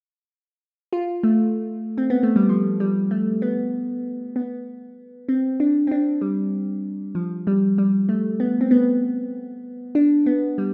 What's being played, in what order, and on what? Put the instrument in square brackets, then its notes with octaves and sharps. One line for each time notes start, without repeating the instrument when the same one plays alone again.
[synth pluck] F4
A3
C4
B3
A3
G3
F3
G3
A3
B3
B3
C4
D4
C4
D4
G3
F3
G3
G3
A3
B3
C4
B3
D4
B3
G3